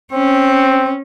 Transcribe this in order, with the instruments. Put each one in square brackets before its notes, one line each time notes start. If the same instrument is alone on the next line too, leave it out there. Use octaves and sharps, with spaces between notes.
[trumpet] C4 [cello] C#4